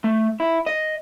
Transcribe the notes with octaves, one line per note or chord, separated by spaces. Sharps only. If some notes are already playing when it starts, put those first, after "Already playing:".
A3
E4
D#5